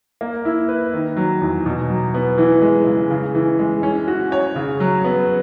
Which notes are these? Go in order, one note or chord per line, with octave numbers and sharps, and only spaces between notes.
A#3
E4
B4
D#3
F#3
E2
B2
F#3
B3
E3
G#3
C#3
C#3
E3
G#3
C#4
F#4
C#5
C#3
F#3
B3